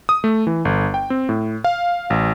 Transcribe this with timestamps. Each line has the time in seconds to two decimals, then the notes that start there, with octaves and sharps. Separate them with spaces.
0.09 D#6
0.24 A3
0.47 E3
0.65 G1
0.94 G5
1.10 C4
1.29 A2
1.64 F5
2.10 A1